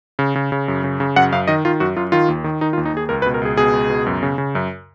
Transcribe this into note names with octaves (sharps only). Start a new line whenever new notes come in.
C#3
C#3
C#3
F#2
C#3
C#3
F#2 F#5
F#2 F5
D#3 D#5
D#3 F4
F#2 F#4
F#2 F4
D#3 F4
D#2
D#3
D#3 D#4
F4
D#2
D#4
D#2 G#4
C#2 A#4
B4
B2
A#4
C#2 G#4
B2 G#4
C#2
B2
F#2
C#3
C#3
F#2